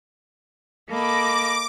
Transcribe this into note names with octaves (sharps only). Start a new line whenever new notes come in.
A#3 A4 D#5 B5 D6